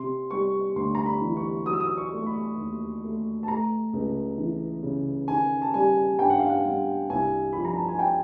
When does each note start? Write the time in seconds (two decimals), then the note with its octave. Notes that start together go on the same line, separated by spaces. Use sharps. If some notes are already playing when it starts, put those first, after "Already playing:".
Already playing: C3 C6
0.31 G3 C#6
0.76 D2 C6
0.95 A#5
1.06 B5
1.22 E3
1.37 C#6
1.66 F#3 D#6
1.73 E6
1.80 D#6
1.97 C#6
2.12 A3
2.26 B5
2.58 D#2
3.03 A3
3.43 A5
3.48 A3 A#5
3.93 C#2
4.38 E3
4.83 C#3
5.28 D#3 G#5
5.62 A5
5.74 G3 G#5
6.18 G2 G5
6.30 F#5
6.39 F5
6.49 F#5
6.64 G2
7.10 C2 G#5
7.53 F3 B5
7.65 A#5
7.76 A5
7.88 G#5
7.99 G5